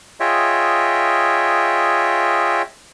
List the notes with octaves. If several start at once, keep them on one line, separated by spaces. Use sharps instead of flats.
F4 G#4 C#5 D#5 E5 G5